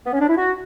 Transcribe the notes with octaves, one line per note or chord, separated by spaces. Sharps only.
B3
C#4
D4
E4
F#4